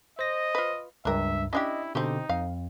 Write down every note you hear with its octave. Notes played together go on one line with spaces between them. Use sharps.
C5 D#5 A#6
F4 B4
C#2 G2 D4 A#4 E5
C#4 D4 E4 G4 D#5
B2 D3 C4 D#4 G4
F2 F5